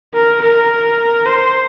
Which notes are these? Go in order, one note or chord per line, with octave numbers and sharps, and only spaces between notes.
A#4
A#4
C5